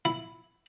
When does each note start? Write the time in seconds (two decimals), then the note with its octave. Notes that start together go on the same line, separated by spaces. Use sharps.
0.05 E4